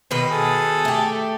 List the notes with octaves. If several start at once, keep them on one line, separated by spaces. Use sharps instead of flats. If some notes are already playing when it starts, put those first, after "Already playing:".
B2 D#3 B4
G#4 A4
A3 G4